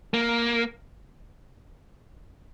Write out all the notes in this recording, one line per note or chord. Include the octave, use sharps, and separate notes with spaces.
A#3